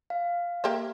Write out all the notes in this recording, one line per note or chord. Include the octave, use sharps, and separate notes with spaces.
F5
A#3 G4 E5